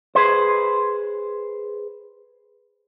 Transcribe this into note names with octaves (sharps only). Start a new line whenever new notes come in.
G#4 B4 C5